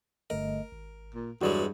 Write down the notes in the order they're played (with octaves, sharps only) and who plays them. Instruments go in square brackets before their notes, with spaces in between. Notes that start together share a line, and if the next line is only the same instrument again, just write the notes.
[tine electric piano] G1 A3 D#5 [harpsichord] A#4
[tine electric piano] G#1
[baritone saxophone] A#2
[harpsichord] E2 F#3 G#3 [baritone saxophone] G2 [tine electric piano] F#4 D5